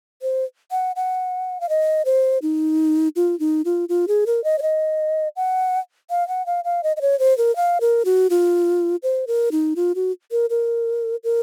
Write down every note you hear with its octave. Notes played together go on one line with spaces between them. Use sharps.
C5
F#5
F#5
F5
D#5
C5
D#4
F4
D#4
F4
F4
G#4
A#4
D#5
C#5
D#5
F#5
F5
F#5
F5
F5
D#5
D#5
C#5
C5
A#4
F5
A#4
F#4
F4
C5
A#4
D#4
F4
F#4
A#4
A#4
A#4